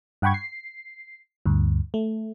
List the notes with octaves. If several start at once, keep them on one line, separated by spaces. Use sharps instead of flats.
G2 F#5 G5 B5 C#6 G#6
C7
D2 G2
A3